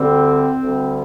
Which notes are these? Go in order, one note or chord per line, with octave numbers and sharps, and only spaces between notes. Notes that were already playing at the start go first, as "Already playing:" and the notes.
Already playing: D2 D3 G3 C4
D2 D3 G3